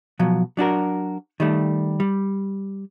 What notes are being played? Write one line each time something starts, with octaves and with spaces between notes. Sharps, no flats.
B2 F3 F#3
F#3 D4 F#4 A#4
D#3 G3 A3
G3